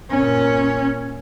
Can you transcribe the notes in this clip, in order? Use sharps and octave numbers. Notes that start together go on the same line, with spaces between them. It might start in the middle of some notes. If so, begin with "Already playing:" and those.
A#2 C#4